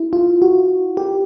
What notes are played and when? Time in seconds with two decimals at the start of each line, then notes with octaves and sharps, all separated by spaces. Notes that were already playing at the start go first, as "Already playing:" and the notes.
Already playing: E4
0.13 F4
0.42 F#4
0.97 G4